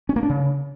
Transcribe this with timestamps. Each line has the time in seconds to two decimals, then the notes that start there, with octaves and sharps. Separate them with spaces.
0.09 C#4
0.16 A#3
0.23 D4
0.30 C#3